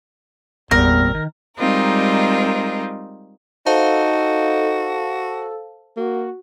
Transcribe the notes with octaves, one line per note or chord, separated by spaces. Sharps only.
G#1 E2 A#2 G3 C4 A#4
D#3
G3 G#3 C4 D#4 F4 A#4
D#4 F#4 A4 C5 F5 A5
A#3 F#4